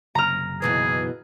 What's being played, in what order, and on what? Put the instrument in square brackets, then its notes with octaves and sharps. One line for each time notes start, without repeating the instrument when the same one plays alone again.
[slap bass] F#1 C3 [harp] A#5 F6
[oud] D#2 B2 E3 [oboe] G#4